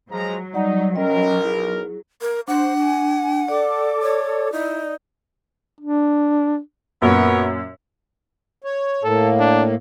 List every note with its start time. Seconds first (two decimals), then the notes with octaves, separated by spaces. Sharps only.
0.11 F3 F#3 G#3 A#5
0.53 G3 D#4 D5 F#5
0.95 B1 C#4 A#4 D#5 G5
1.44 E4 G#4
2.21 A#4
2.48 D4 C5 F#5
2.79 G#5
3.48 A4 D5 D6
4.02 C#5
4.52 D#4 E4
5.81 D4
7.02 F#2 A#2 B3 A#4 C#5
8.64 C#5
9.03 A2 A#3 A4
9.39 D4